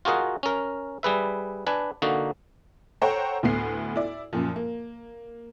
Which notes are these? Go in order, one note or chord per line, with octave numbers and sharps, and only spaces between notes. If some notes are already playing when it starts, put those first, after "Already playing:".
F4 F#4 G#4 A#4 D#5 F#5
C#4 A#4
G3 G#4 B4 E5
D4 B4 G#5
D3 A#3 D#4 F#4
A4 C5 C#5 F#5 G5 A#5
D2 A2 B3 C7
E4 D5
F#2 A#2 F3
A#3